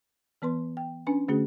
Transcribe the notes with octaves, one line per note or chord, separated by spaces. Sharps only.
E3 B3 B4 C6
G5
C#4 D4 B4 G#5
D3 A3 C#4 F#4 G#4